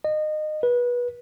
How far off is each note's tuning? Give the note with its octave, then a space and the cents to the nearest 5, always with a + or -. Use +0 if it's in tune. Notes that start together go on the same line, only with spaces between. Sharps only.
D#5 -25
B4 -25